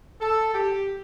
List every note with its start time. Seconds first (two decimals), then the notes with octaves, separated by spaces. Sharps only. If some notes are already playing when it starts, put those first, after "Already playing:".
0.21 A4
0.54 G4